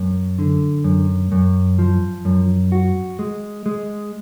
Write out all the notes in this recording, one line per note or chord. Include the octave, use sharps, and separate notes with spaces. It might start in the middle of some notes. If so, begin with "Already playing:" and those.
Already playing: F#2
D3
F#2
F#2
F3
F#2
F#4
G#3
G#3